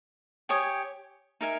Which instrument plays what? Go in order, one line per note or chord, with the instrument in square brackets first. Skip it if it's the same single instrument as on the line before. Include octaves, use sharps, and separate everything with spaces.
[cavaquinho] G4 C#5 G#5 D#6
D#4 A#4 E5 G#5